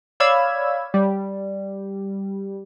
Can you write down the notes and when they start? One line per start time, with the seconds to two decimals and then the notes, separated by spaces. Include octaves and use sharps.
0.20 C#5 D5 F5 B5 E6 G#6
0.94 G3